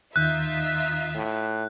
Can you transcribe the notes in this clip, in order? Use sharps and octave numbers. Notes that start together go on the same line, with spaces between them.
D#2 D#3 D#4 F4 E5 F#6 G6
A2